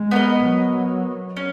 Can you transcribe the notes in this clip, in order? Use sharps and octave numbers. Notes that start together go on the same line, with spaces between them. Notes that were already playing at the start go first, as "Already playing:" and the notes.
Already playing: G#3
B3 D#4 A#4 D#5
F#3
C#4